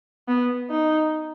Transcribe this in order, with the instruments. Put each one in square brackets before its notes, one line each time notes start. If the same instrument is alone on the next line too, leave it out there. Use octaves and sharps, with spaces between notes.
[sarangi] B3
D#4